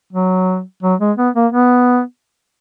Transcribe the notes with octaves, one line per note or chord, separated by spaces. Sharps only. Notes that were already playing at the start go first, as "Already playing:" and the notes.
F#3
F#3
G#3
B3
A#3
B3